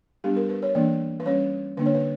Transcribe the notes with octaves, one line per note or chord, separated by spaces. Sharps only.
G3 B3 D4 G4
A#4
B4
C#5
E3 A#3 D4 D5
B4
G3 C#4 C#5
D3 A#3 D4 B4
C#5
B4